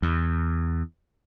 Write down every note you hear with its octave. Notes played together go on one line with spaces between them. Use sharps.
E2